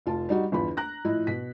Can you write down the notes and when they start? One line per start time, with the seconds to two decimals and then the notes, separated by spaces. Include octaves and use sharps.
0.06 F1 F4 A5
0.29 G3 D#4 F#4
0.52 G1 E2 F4 B5
0.77 A#5 F#6 A#6
1.04 A2 F3 E4 D#5
1.27 B2 B6